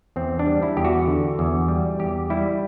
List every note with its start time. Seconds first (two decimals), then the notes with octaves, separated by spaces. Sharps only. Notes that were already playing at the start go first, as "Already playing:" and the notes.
0.16 E2 C4
0.39 D4
0.46 G3
0.63 E4
0.77 E2 G4
0.85 F#4
1.07 D3
1.39 E2
1.68 G3
1.99 E2 G4
2.30 G3 E4